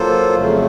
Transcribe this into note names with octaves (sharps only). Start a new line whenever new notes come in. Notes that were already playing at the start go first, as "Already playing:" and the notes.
Already playing: F#3 A#3 F4 A4 C5
F2 C#3 F#3 A3